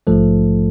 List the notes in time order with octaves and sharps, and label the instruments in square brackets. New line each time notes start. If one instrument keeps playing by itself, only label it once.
[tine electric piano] A#1 G#2 F3 A3 A4